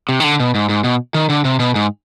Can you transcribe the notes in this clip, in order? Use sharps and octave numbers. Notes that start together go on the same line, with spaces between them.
C3
D#3
D3
B2
G#2
G#2
B2
D#3
D3
C3
B2
G#2